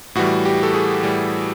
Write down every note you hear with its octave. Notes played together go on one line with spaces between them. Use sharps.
A2 E3 G3 F#4
G4
A4
G#4
A2 E3 G3